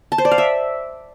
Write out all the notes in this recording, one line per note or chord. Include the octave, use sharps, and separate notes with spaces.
A5
C5
D5
F5
E5